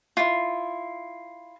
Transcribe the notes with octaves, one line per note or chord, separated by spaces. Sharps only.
E4 F4